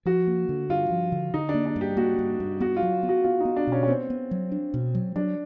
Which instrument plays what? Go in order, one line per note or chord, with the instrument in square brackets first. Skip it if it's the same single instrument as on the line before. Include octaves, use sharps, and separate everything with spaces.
[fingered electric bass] F3 [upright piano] F#4
[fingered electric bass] A#3
D3
[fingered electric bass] G2 [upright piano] F4
[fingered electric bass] F3
D3
[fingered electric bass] D3 [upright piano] D#4
[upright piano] D4
[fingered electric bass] A#3
[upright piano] D4
[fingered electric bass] G2
[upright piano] G4
[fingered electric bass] A#3 [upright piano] F#4
[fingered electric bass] G2
G2
[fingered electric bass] B3 [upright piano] F#4
[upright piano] F4
[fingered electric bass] F#3
B3
[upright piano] F#4
[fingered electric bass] B3 [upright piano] F4
[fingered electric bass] B3 [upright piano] D#4
[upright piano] D4
[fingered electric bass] B2 [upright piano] C#4
[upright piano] C#4
[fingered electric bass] B3 [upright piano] C4
[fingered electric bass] B3
F#3
D4
B2
F#3
[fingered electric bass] F#3 [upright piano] D4